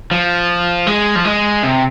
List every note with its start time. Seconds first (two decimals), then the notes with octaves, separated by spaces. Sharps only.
0.11 F3
0.87 G#3
1.16 F3
1.25 G#3
1.63 C3